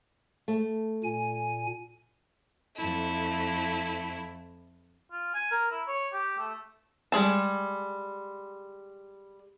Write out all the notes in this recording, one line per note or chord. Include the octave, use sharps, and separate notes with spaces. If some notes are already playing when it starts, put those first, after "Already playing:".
A3
A#2 G#5
F2 A3 E4
F4
G#5
A#4
E4
C#5
G4
A3
G3 G#3 G#4 A5